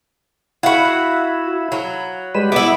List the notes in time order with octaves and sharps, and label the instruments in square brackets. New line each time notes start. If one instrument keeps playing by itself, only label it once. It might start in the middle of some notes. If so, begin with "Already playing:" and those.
[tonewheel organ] E4 [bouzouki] F#4 F#5 [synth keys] F5 B5
[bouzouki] F#3
[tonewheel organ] G3 G#3 B4 [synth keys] E7
[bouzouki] B3 E4 [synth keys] E5 [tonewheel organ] D6